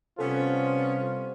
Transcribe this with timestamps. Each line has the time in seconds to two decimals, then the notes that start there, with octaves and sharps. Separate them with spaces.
0.19 C3 G3 B3 C#4 F4 A4 C5